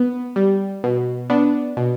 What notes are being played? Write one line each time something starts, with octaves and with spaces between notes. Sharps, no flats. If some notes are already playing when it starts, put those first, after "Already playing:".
Already playing: B3
G3
B2
B3 D4
B2